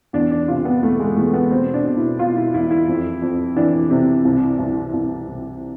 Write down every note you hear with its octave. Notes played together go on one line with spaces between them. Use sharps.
E2 D4
D4
C3 F4
B3
E2 A3
G#3
E2 A3
B3
B2 C4
D4
B2
E4
B2 F4
E4
E2 E4
E4
F2
F2
E3 D4
C3
C2
C2
C2
C2